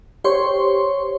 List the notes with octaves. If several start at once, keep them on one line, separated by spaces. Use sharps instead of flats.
G4 C5 C#5 C6 C#6